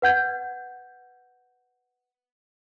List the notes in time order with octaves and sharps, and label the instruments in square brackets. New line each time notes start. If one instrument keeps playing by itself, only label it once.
[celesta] B4 F#5 G6 G#6